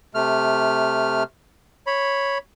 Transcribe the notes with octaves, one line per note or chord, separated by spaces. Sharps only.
C3 A3 F6
C#5 B5